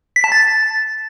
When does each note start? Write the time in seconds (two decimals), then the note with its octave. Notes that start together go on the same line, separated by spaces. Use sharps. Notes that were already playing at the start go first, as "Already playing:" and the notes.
0.16 B6
0.24 A5
0.32 A6